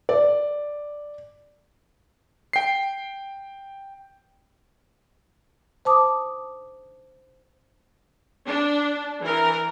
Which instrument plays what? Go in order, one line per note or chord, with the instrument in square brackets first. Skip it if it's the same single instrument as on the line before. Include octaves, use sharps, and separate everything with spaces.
[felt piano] D5
[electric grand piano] G5 C7
[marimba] C5 A5 D6 D#6
[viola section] D4
E3 A#4